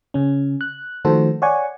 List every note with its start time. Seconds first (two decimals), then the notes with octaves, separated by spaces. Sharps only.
0.14 C#3 C#4
0.61 F#6
1.05 D#3 F3 A3 F#4 A4 C5
1.42 C#5 D5 F#5 G#5 C#6